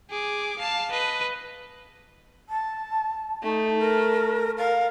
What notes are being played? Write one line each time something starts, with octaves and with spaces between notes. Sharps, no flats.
G#4 D6
F5 A5
B4 D#5
A5
A3 D#4
A#4
A#4 F5